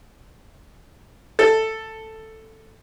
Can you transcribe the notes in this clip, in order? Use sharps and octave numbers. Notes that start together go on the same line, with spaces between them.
A4